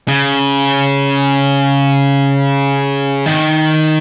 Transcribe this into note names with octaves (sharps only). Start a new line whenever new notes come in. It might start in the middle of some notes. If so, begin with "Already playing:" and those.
C#3
D#3